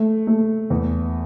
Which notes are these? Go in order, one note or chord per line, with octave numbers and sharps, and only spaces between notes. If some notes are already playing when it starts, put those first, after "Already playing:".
Already playing: A3
A3
E2